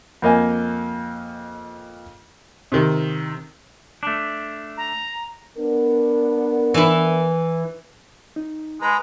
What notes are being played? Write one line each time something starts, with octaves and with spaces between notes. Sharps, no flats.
F2 A#3 D#5 G#5
C3 D#3
A3 D4
A#5
B3 D4 A#4
E3 E4
D#4
G#3 B4 A#5